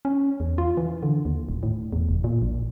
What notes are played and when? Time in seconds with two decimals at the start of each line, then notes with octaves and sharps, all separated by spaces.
0.05 C#4
0.40 E2
0.58 F4
0.77 E3
1.03 D3
1.25 D#2
1.49 D#1
1.63 A2
1.93 E2
2.09 F1
2.24 A#2
2.42 A#1